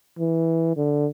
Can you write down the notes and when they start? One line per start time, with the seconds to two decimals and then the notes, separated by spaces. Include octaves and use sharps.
0.19 E3
0.77 D3